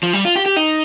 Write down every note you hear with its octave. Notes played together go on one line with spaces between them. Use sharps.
F3
G3
F4
G4
G4
D#4